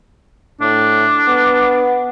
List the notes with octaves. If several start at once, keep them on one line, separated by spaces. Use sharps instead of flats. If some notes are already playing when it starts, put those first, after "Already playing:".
A2 D4
B3